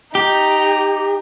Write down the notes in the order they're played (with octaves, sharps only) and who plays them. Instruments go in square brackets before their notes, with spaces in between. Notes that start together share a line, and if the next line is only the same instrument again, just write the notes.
[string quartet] D#4 [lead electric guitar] G4